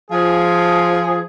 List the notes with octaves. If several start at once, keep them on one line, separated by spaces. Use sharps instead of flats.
F3 G#4